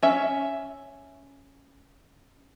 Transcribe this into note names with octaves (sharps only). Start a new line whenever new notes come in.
C#4 E5